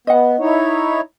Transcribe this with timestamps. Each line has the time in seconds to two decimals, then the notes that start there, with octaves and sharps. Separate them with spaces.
0.07 B3 D#5 F#5
0.39 D#4 E4 C#5